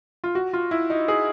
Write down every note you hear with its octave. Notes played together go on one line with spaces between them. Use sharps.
F4
F#4
F4
E4
D#4
G#4